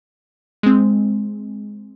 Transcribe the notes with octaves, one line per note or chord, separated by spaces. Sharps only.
G#3 C4